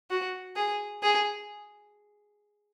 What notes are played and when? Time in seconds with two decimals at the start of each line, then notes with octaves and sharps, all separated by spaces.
0.11 F#4
0.56 G#4
1.03 G#4